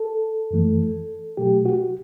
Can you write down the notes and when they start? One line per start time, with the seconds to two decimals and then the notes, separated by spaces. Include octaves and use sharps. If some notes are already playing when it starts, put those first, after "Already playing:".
Already playing: A4
0.51 F#2 E3 A3
1.37 B2 F#3 A3 G4
1.66 F#4